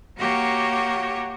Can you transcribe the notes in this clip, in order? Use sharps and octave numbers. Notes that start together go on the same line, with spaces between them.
A#3 F#4 G4 C#5 F#5